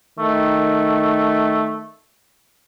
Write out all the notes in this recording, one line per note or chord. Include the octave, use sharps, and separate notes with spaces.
D#3 A3